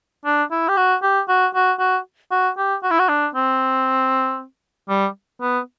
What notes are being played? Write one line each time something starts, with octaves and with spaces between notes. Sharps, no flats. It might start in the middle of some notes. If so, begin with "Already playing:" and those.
D4
E4
G4
F#4
G4
F#4
F#4
F#4
F#4
G4
F#4
E4
F#4
D4
C4
G3
B3